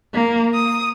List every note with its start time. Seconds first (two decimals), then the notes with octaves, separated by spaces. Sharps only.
0.13 A#3
0.54 D#6